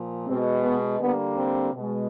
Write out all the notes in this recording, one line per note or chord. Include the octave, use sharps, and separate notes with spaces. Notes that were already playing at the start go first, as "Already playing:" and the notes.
Already playing: A#2 F3
B2 G#3 C4
B3
D3 G3 A#3 B3
C4
B2 G#3